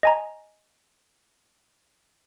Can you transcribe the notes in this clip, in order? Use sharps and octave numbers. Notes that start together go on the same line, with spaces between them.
D#5 G#5 A#5